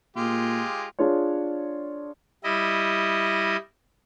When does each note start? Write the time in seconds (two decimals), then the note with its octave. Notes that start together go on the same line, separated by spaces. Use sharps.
0.16 A#2 G#3 F4 G4
0.99 D4 F4 G#4 C#5
2.44 G3 E4 D#5